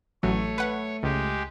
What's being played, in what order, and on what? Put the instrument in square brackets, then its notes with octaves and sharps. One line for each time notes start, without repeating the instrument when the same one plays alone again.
[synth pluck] A1 F#3 [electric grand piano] A3 [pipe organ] C#5
[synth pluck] B4 F#5
[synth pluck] C#2 [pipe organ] G#3 G4